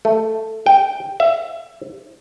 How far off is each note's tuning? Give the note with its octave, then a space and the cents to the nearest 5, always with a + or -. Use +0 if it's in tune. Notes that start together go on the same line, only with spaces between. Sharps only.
A3 +5
G5 +0
E5 +20